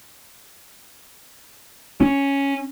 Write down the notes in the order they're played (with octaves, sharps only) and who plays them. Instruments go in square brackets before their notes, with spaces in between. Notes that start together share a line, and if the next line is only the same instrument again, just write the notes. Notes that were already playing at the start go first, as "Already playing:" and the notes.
[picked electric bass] C#4